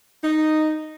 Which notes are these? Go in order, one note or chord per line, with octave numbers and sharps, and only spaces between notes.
D#4